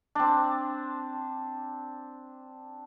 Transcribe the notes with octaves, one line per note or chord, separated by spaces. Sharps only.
C4 D4